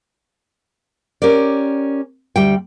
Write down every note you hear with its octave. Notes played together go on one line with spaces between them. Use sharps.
C#4 G4 A#4 D5
D2 G3 G5